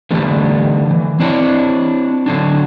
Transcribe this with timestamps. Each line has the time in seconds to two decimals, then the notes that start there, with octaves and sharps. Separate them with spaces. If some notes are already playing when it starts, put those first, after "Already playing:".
0.11 D3 E3 G3 A3
0.91 E3
1.20 C4 D4 E4 C#5
2.26 D3 F#3 D4